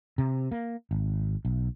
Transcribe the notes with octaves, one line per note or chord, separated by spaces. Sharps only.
C3
A#3
G#1
B1